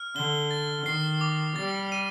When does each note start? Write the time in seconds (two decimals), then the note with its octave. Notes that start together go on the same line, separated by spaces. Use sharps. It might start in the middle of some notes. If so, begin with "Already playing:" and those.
Already playing: F6
0.15 D3 G7
0.51 A6
0.86 D#3 C7
1.21 D6
1.56 G3 A6
1.92 D#7